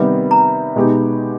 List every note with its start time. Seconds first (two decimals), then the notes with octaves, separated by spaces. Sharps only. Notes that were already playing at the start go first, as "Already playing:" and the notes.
Already playing: C3 D#3 G3 B3 D#4
0.31 A#5
0.76 B2 G#3 B3 D#4 G4